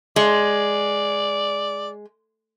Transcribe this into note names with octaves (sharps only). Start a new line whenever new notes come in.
G#3 D5